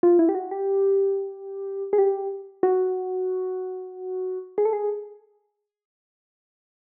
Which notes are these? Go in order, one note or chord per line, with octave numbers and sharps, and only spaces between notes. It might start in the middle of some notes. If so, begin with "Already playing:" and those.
F4
E4
G4
F#4
G4
G#4
G4
F#4
G#4
A4
G#4